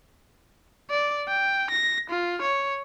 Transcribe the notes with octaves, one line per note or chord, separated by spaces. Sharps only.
D5
G5
A#6
F4
C#5